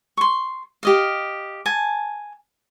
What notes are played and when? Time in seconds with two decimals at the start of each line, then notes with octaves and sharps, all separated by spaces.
0.17 C6 C#6
0.83 G4 D#5 F5
1.66 G#5 A5